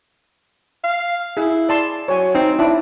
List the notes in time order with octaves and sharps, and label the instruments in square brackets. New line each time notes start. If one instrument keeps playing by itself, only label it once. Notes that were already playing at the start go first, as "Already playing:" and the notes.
[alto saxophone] F5
[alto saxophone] E4 [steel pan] G#4
[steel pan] D5 A5 C6
[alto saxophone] F#3 [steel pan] C#5 G#5
[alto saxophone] C4 [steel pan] D#4
[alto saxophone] D4 [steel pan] E4